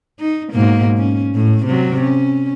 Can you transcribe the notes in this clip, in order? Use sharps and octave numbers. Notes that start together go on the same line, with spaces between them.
D#4
G#2 B2 A#3
C#4
A2
C3 F#3
C#4